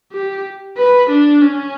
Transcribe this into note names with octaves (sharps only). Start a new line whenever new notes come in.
G4
B4
D4
C#4